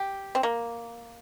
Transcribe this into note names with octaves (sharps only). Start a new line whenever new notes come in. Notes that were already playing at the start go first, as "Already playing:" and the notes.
Already playing: G4
C4
A#3